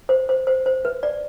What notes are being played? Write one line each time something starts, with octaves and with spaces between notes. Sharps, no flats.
C5
C5
C5
C5
B4
D5